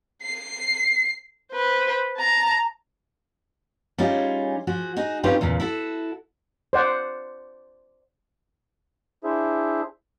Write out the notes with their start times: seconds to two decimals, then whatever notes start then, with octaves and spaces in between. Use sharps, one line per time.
0.23 C7
1.53 B4 C5
2.17 A5 A#5
3.98 G3 C#4 D#4 F4 G#4
4.67 F3 F#4 G#4
4.97 D#4 F#4 G#4
5.23 C4 C#4 D#4 F4 G4 B4
5.41 E2 A#2 C#3 E3
5.60 E4 F#4 A4
6.73 C5 D5 F#5
9.24 D4 E4 G#4 C5 E5